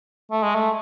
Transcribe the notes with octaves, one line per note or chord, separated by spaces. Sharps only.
A3
G#3
A3